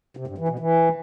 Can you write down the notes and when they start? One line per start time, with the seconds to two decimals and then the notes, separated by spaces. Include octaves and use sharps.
0.17 C3
0.27 G2
0.38 E3
0.48 B2
0.59 E3